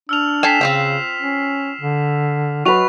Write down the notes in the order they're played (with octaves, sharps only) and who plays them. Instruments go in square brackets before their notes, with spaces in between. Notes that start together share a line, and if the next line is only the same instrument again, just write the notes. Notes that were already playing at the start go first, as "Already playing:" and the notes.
[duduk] D4 [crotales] E6 F6 F7
[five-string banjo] A4 G5 G#5 [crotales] B6 C7 E7
[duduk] C#3 [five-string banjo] C4 F4 G5
[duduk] C#4
D3
[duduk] F#3 [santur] F#4 B4 [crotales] C#6 F7